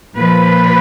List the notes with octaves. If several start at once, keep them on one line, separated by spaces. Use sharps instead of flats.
A#2 F3 B4